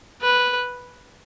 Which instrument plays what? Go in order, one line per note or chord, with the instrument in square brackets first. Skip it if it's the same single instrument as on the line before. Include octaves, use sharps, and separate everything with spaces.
[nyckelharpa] B4